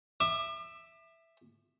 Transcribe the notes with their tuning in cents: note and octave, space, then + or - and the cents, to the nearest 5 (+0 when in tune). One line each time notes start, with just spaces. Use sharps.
E5 +0 D6 +40